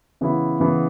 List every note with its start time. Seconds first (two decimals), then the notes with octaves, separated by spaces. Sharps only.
0.21 C#3 E3 B3 E4
0.60 C#3 E3 B3 E4